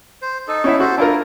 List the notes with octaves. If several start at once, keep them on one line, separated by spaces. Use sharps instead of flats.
C5
D#4 A4
C#4 E4 E5
F#4 A4 C5
D4 E4 F4 A#4